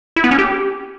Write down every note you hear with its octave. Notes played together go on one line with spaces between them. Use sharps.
E4
B3
C#4
G4